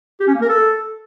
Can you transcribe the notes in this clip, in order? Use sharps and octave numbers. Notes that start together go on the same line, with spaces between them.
G4
C#4
A#3
A#4
A4